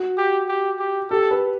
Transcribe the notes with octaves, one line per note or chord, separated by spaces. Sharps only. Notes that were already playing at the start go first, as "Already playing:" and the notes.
Already playing: F#4
G4
G4
G4
G4 A4
B4